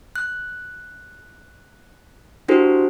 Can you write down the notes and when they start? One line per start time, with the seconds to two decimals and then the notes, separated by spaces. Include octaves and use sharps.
0.16 F#6
2.48 D4 E4 F#4 G4 A4 C5